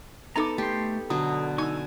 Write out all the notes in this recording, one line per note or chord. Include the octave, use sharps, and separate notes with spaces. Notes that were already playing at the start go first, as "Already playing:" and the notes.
B3 D#4 A4 A#5 D6
A3 G4 C6
B2 D3 F#3 D#6
D#4 G#5 C#6 E6